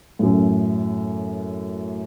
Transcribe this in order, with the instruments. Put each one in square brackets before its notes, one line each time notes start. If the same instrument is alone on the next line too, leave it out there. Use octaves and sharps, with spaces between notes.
[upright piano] F#2 A2